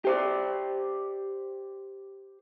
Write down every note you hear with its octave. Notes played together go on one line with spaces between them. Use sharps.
G4 C5 D5